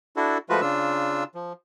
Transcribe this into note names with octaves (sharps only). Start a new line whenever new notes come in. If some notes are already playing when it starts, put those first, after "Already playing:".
D4 E4 F#4 A4
F3 G#3 A3 F4 F#4 B4
C#3 D4 F4 E6
F3